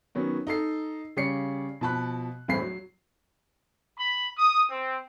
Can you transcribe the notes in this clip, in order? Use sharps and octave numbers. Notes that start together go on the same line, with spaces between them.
D#3 F#3 B3 C#4
D#4 A4 C7
C#3 G3 C#5 D5 C7 C#7
B2 F3 A5 B5 F#6
G1 E2 A2 C4 B5 C7
F#3
B5
D#6
C4